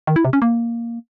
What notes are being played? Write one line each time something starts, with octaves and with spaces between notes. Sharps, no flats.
D#3
E4
C3
C#4
A#3